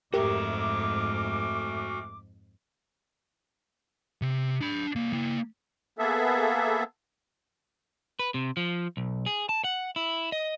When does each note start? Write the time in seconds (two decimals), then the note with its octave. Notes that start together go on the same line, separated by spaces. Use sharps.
0.14 F2 G#2 A3 F#4 G4 A#4 E5 D6
4.22 C3
4.61 D4 B5
4.96 C2 A#3
5.13 A#3 E4
5.99 A#3 B3 G#4 A4 E5
8.19 B4
8.34 C3
8.57 F3
8.97 B1
9.26 G#4
9.49 A5
9.64 F#5
9.96 E4
10.32 D#5